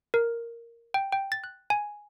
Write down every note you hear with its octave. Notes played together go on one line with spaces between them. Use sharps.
A#4
G5
G5
A6
F#6
G#5